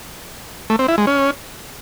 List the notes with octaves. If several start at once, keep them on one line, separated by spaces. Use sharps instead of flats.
A3
C4
E4
G#3
C#4